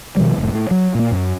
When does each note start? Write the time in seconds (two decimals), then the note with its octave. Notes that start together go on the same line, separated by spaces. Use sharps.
0.17 B2 D#3 F3 G3
0.38 F1 A2
0.53 A2
0.71 F#3
0.95 A#2 A#3
1.12 F#2